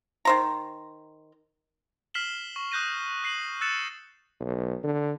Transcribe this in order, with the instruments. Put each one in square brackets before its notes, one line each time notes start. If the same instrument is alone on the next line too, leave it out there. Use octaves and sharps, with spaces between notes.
[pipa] D#3 C5 A#5
[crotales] F6 B6 C7 E7 F#7 G7
C#6
D#6 F#6 G6 A#6 D#7
F#6 C7 D#7 F#7
E6 F#6 A6 C#7 E7
[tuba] B1
D3